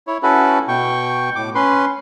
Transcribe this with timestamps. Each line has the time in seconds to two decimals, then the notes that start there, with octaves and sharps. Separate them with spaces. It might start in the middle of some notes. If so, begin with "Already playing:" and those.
0.07 E4 C#5
0.23 C#4 E4 F#4 A4 B4
0.68 B2 G5 C#6
1.36 A2 D6
1.55 C#4 B4 C6